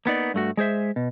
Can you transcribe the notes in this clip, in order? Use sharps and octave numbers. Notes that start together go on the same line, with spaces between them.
A#3 B3 D#4 D5
G2 A3 F#4
G#3 G#4 C5 E5
B2